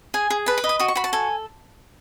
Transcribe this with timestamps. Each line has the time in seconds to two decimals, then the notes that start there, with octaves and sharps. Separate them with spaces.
0.14 G#4 G#5
0.30 G#4
0.46 B4 A5
0.58 B5
0.64 D#5
0.69 D#6
0.79 F#4 D#6
0.88 C#6
0.95 F#4 B5
1.04 A5
1.13 A4 G#5